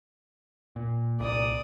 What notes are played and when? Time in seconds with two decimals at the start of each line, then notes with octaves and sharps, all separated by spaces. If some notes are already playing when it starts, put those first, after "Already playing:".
0.76 A#2
1.20 C2 A#2 D5 D#6